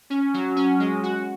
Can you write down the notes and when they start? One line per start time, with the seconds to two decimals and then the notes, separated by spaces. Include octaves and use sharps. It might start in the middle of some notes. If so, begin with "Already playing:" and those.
0.10 C#4
0.34 F#3
0.56 C#4
0.80 G#3
1.03 F#4